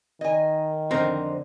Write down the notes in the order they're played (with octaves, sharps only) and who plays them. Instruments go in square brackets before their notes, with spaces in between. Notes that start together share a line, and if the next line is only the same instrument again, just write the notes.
[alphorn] D#3 [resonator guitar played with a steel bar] D#5 G#5
[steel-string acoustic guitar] F2 D3 [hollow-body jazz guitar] C4 D#4 A#4